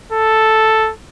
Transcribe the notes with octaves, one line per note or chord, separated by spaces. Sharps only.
A4